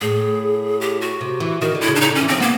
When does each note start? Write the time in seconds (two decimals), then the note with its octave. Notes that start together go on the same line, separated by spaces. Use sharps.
0.01 A2 G#4
0.81 G4
1.01 F#4
1.21 C3
1.40 E3
1.61 D#3 F#4
1.75 D3
1.81 E4
1.88 C#3
1.95 D4
2.01 C#3 D#4
2.11 D3
2.15 C#4
2.21 E3
2.28 F3 C4
2.40 A#3 B3